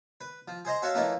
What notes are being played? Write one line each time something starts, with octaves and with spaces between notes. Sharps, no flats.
B4
F3
G#4 C5 D#5 A#5
F#4 A4 C#5 E5 F5
E3 F3 A3 A#3 C#4 D#4